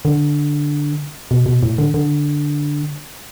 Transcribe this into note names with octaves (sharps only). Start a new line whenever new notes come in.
D3
B2
B2
A2
D3
D3